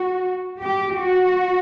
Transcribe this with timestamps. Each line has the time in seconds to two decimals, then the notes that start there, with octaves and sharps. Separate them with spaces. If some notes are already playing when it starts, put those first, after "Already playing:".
Already playing: F#4
0.60 G4
0.99 F#4